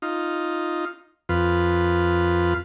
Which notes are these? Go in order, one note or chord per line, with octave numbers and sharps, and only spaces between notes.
D#4 F4
F2 F4 B4